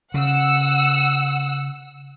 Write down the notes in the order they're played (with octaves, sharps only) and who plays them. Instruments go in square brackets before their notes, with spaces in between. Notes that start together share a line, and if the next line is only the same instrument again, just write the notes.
[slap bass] C#3 [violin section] F#5 E6